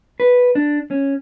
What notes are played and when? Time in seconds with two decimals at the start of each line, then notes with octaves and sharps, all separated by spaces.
0.20 B4
0.55 D4
0.91 C#4